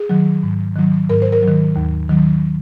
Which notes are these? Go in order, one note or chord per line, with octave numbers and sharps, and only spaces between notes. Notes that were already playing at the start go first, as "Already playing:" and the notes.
Already playing: G#4
D#3 F#3
G#2
D#3 F#3
G#2 A#4
C5
A#4
D#3 F#3
D#2
D#3 F#3